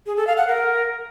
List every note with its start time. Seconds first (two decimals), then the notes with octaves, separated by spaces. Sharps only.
0.06 G#4
0.17 A4
0.27 F5
0.37 F#5
0.47 A#4